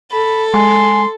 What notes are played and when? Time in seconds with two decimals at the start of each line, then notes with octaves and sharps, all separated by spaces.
0.12 A4 B5
0.54 G#3 G#5 C6